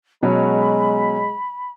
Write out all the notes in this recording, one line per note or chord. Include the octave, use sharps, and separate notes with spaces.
B2 F#3 G#3 C#4 B5